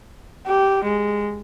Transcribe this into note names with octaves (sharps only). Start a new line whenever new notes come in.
G4
G#3